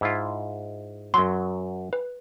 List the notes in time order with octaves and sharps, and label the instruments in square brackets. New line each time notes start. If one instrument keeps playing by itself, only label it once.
[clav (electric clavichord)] G#2 E4 F4
[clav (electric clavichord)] F#2 F#3 [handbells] C6
[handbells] B4